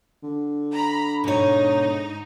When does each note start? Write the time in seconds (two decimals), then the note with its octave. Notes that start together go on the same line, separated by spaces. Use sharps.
0.23 D3
0.71 A#5 B5
1.24 G#2 B2 D#4 C#5